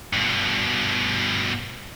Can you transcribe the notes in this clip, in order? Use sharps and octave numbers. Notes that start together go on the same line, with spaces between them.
G2 B2